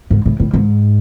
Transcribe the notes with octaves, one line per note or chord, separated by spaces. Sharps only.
G#2
A2
A2
G#2